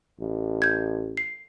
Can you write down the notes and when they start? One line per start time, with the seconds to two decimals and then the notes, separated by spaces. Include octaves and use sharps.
0.20 A1
0.62 G6 G#6
1.17 C7